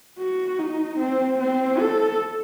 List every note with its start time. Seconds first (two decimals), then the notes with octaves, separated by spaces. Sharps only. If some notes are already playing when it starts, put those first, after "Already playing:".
0.19 F#4
0.58 D#4
0.99 C4
1.39 C4
1.79 A4